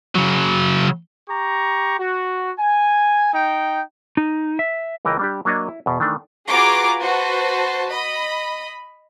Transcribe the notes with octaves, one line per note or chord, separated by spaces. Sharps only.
C#3 F#3
G4 A#5 C#6
F#4
G#5
D#4 G5
D#4
E5
C#2 E3 A#4 D#5 G5 A#5
G3 D4 G4
F#3 A#3 D4 C#5 D#5
E4
E2 B2
D#3 E3 A3 D4
F4 F#4 G#4 B4 A#5 D6
F#4 B4 C5 A5
D#5 B5